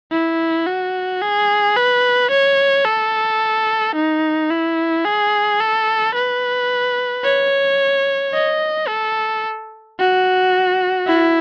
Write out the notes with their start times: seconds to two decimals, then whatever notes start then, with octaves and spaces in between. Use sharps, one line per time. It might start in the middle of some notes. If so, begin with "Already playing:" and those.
0.12 E4
0.66 F#4
1.22 G#4
1.76 B4
2.31 C#5
2.85 A4
3.95 D#4
4.50 E4
5.05 G#4
5.60 A4
6.15 B4
7.25 C#5
8.34 D#5
8.88 A4
9.99 F#4
11.07 E4